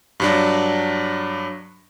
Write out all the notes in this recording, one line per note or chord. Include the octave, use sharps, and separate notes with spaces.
G2 F#3 D4